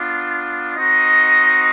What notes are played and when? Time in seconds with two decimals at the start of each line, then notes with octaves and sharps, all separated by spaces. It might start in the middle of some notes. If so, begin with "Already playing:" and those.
Already playing: B3 D4 F4
0.76 C4 D#4 F#4 D#5